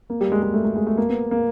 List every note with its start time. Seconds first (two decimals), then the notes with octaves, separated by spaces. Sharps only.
0.10 A#3
0.21 G3
0.32 G#3
0.42 G#3
0.54 A3
0.65 A3
0.76 G#3
0.87 A3
0.98 A#3
1.09 B3
1.31 A#3